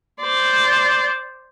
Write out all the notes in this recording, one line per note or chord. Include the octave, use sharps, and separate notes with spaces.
C5 D5